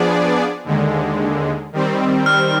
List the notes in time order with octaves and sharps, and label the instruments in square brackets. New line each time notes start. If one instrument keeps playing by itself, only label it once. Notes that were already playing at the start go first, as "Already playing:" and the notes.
Already playing: [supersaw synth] F3 B3 D4 G#4 D5
D#2 D3 G#3
D#3 G3 C4
[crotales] F6